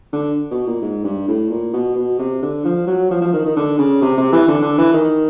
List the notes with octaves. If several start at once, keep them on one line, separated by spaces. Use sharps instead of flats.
D3
B2
A#2
G#2
G2
A2
A#2
B2
B2
C3
D3
F3
F#3
F3
F3
D#3
D#3
D3
C#3
C3
C3
E3
D3
D3
E3
D#3